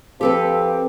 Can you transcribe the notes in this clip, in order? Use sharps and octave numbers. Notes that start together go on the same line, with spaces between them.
F3 C4 G4 A4 B4